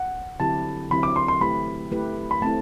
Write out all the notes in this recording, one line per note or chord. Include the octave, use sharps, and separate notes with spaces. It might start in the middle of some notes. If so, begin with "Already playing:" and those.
Already playing: F#5
D3 F#3 C4 E4 G4 A5
D3 F#3 C4 E4 G4 B5
D6
C6
C6
A3 E4 G4 B4 B5
A3 E4 G4 B4
B5
A3 C4 E4 A5